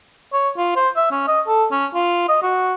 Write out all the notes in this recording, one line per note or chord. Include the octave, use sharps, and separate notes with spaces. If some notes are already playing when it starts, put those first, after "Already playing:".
C#5
F4
C5
E5
C#4
D#5
A4
C#4
F4
D#5
F#4